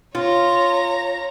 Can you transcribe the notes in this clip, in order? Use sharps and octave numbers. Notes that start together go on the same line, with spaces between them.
F4 C#5 A#5